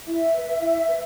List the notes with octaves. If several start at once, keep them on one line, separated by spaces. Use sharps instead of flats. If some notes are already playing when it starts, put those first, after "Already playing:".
E4 E5
B4
E4
B4